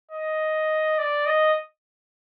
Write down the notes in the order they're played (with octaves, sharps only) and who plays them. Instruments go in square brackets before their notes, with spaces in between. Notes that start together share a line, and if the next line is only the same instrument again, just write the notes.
[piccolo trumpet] D#5
D5
D#5